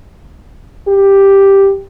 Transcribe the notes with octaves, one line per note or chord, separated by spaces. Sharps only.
G4